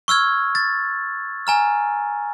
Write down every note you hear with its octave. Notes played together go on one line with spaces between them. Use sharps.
C#6 E6 F6 G#6
A6
G#5 A#5 F6